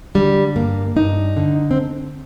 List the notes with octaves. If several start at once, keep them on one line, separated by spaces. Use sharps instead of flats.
D3 G3
G2 A#3
G2 D#4
D3
C4